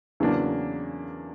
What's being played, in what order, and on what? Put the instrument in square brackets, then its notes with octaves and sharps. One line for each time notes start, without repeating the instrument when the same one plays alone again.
[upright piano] E2 C#3 F#3 A#3 D4